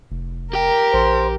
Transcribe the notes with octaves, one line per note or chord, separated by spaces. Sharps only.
F1
G4 A#4 G5
A#1 C5